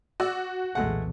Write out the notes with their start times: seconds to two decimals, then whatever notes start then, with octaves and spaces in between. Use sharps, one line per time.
0.20 F#4 D5 E6
0.75 B1 E2 A#2 G#3 A3 F#5